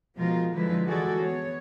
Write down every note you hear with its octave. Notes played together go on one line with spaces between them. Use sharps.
B2 F3 G#3 F4 A#4
D3 F3 F#3 G#3 E4 B4
E3 G#3 F#4 G#4 A4 D5
B3 C#5